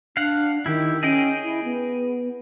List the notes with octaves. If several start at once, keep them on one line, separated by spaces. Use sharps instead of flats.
D4 F5 F#5
D#3 E4 G4
C#4 G#4 D#5 G5
E4
B3